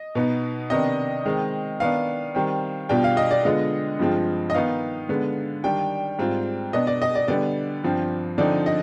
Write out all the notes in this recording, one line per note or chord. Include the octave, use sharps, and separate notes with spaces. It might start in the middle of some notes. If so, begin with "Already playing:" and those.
Already playing: D#5
B2 B3 D#4
C3 D#3 B3 D4 D#5
D#3 G#3 C4
D#3 B3 D4 F5
D#3 G3 C4
B2 G3 D4 F4 G5
F5
D#5
D5
D3 G#3 B3 F4 D#5
G2 F3 G#3 C4 F4
D#5
D#3 B3 D#4 F5
D3 G#3 B3
D#3 G3 D4 G5
G#2 G3 C4 F4
B2 B3 D4 D#5
D5
D#5
D5
D3 G3 B3 D5
G2 F3 C4
D3 F3 C4 D#4 D5
D#5